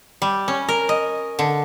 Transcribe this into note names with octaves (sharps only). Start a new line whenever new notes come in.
G3
C#4
A#4
D#5
D3